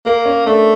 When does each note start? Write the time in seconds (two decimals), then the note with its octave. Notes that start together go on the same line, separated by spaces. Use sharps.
0.06 A#3 A#4
0.26 C#4
0.46 A3 D4